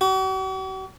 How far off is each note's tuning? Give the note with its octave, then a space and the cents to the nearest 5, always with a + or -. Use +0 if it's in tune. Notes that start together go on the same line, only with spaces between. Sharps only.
F#4 +45